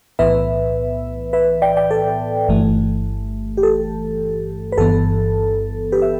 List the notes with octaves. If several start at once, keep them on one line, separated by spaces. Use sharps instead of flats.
B1 A2 E3 B3 B4 E5
B4 E5
D5 G5
D5 G5
A4 D5
G1 G2 E3 A3
G4
A4
B4
G1 G2 E3 B3 A4
G4 B4
E5